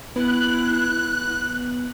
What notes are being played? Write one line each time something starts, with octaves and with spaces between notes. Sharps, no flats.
B3 E4 F#6